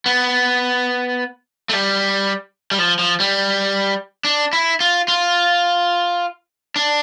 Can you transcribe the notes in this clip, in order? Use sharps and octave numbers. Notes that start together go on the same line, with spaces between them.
B3
A3
G3
G3
F3
F3
G3
D4
E4
F4
F4
D4